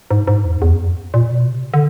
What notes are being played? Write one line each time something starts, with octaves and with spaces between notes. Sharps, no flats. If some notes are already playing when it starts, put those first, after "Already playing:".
G#2
G#2
E2
E2
F#2
F2
A#2
B2
C3
D3